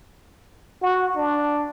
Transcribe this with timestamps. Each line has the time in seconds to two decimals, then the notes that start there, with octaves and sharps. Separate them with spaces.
0.82 F#4
1.16 D4